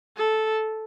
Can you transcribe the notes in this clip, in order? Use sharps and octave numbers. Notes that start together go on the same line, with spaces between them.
A4